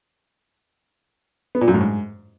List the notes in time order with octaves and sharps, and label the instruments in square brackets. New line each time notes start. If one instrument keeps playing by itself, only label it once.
[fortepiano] B3
A#2
F#2
A2
G#2